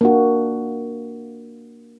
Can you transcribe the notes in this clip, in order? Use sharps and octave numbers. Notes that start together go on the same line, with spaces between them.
A#3 D4 F#4